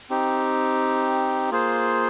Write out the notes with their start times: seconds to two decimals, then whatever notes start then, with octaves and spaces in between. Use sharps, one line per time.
0.10 C4 D#4 G4
1.51 A#3 F4 G#4 C5